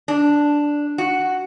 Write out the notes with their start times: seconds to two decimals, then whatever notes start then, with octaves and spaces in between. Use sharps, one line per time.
0.08 D4
0.98 F#4